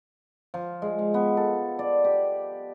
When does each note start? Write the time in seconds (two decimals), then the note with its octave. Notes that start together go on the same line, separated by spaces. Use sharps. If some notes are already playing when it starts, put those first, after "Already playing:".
0.54 F3
0.82 G#3
0.99 F5
1.14 B3
1.37 A4
1.79 D5
2.04 G4